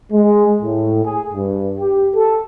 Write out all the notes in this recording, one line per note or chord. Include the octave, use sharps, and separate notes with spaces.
G#3
A2
G#4
G2
G4
A4